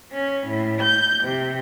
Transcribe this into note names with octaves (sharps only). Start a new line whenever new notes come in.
C#4
A2
G6
C3